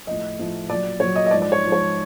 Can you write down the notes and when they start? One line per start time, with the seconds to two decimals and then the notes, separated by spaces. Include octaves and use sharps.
0.07 A2 F3 D#5
0.39 A2 F3
0.69 A#2 F#3 D5
1.00 A#2 F#3 C#5
1.16 D#5
1.26 D#5
1.31 G#2 F3 D5
1.42 D5
1.52 C#5
1.63 G#2 F3
1.72 C#5